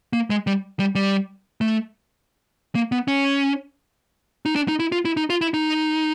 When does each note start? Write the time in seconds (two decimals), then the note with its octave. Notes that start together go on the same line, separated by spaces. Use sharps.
0.13 A#3
0.30 G#3
0.47 G3
0.79 G3
0.95 G3
1.61 A3
2.75 A#3
2.92 B3
3.08 C#4
4.46 D#4
4.56 D4
4.68 D#4
4.80 E4
4.92 F4
5.05 E4
5.17 D#4
5.30 F4
5.41 E4
5.54 D#4